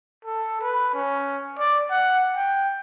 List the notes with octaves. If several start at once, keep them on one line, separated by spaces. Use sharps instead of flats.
A4
B4
C#4
D5
F#5
G5